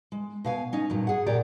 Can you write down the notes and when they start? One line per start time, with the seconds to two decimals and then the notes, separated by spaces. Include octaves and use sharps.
0.12 G#3
0.44 B2 F5 G#5
0.73 C#4 D#4
0.90 G2 A#2 F#3
1.07 G#4 F#5
1.26 A#2 G4 C#5 D5 A#5